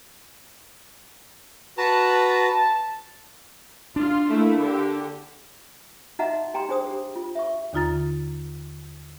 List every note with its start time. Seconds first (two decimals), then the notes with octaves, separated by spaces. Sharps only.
1.78 F#4 B4 A5 A#5
3.96 D4 F4
4.28 A3 A#3 E4
4.63 D3 G4
6.19 D#4 F#4 D#5 E5 F#5 A#5
6.54 G4 G5 A#5 C6
6.69 D4 G#4 C5 D#6
6.87 G4
7.15 F4
7.35 E5 C#6
7.73 D#2 D3 D#4 F4 A#5 A6